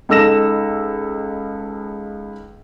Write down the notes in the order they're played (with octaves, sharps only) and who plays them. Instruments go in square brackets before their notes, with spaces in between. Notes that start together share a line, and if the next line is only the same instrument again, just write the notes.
[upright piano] C#2 D#4 A4 E6 A#6 E7